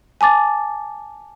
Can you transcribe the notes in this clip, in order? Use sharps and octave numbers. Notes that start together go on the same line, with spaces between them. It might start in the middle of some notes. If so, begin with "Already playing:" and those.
G#5 A5 D6 A6